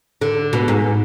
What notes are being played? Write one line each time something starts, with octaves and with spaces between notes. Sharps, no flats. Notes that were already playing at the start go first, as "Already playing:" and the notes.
D3
B2
G#2